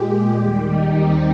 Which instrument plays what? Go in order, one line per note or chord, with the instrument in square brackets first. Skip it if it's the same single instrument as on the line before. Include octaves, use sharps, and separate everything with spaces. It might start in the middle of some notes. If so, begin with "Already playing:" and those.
Already playing: [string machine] A#2 G#3 G4
D#2 D#3 G3 G4
D#4
C4